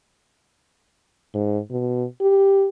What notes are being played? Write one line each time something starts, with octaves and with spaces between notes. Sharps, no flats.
G#2
B2
G4